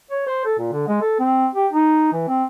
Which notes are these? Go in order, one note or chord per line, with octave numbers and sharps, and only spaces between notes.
C#5
C5
A4
A#2
D3
G#3
A4
C4
G4
D#4
E3
C4